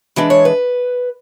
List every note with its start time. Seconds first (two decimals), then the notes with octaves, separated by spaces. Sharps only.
0.16 E3 G#3 D4 B4
0.30 C#5
0.45 B4